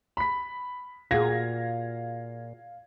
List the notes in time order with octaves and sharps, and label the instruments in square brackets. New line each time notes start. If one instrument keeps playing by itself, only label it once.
[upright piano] B5 B6
[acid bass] A#2 [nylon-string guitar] F4 F#4 G#4 [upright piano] F5 G#6 A#6